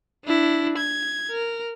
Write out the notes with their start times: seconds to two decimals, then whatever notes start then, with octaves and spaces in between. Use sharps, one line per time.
0.25 D4 E4
0.78 G#6
1.32 A#4